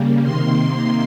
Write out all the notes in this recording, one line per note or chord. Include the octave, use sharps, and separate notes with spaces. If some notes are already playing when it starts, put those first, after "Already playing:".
Already playing: C#3 G3 A#3
C3 D#3 A#3 C6